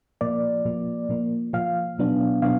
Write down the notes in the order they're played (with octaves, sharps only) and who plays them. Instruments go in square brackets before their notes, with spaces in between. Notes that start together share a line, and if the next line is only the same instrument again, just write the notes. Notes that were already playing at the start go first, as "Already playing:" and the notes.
[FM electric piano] A#2 F3 A#3 D5
A#2 F3 A#3
A#2 F3 A#3
A#2 F3 A#3 F5
B2 F#3 B3 D4
B2 F#3 B3 D4 F5